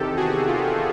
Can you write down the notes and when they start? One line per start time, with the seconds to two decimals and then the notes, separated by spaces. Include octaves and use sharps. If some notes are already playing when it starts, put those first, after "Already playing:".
Already playing: E2 C3 D#3 G4 A4
0.17 F#4 G#4
0.48 F4 G4